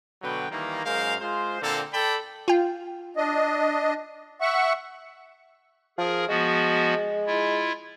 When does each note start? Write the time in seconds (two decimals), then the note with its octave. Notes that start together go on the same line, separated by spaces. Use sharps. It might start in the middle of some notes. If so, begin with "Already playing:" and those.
0.22 B2 D3 F#3 B4 G5
0.51 D#3 E3 G3 A#3
0.85 F#2 G#3 A#4 C5 F5
1.20 G#3 F4 C5
1.62 A#2 D3 A#3 C4 A4
1.93 A4 D5 G5 A5 B5
2.48 F4 G5
3.17 D4 D#5
4.41 E5 F#5 C#6
5.98 F3 G#4 A#4
6.28 F3 G#3 B3 F#4
7.27 E4 F4